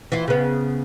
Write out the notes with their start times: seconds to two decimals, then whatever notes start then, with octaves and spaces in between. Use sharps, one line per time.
0.12 E3 F4
0.28 C#3 B3